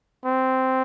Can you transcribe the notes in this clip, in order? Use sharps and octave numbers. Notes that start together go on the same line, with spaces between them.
C4